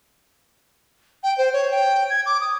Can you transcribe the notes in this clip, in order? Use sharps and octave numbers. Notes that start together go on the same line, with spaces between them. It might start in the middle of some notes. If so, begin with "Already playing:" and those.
G5
C5
C#5
G5
G#6
D6
D#6